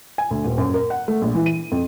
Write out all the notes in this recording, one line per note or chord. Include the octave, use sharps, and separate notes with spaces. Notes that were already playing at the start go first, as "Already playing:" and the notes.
G#5
D2
D#1
F#2
A#4
F#5
A3
A#1
E3
D#7
F2